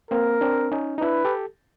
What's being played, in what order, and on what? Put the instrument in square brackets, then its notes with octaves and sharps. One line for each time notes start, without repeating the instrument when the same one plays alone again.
[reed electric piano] A#3 C4 [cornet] A#4
[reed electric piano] C4 D4
C#4 D#4
D#4
[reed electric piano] D4 E4 [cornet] B4
[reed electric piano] G4 A4